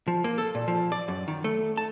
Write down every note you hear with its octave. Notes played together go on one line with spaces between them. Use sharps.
F3
A#3
A4
A#2
F3
D5
F#2
D#3
A3
A5